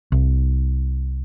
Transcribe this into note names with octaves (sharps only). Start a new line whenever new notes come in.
C2